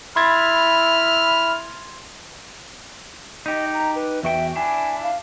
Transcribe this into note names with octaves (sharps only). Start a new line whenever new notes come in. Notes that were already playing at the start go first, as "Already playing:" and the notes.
E4 B5 C6 E6 F6 G#6 A6
D#4 G4 D#5
A#5
B4
E2 F#4 E5 G5
D4 E4 G#5
F5